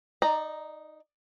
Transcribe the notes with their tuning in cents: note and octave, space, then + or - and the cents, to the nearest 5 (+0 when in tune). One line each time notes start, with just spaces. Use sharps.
D#4 +0 D5 +30 A#5 +0